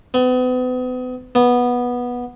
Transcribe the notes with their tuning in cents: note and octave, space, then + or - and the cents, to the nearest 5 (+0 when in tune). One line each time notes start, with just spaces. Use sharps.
B3 +40
B3 -10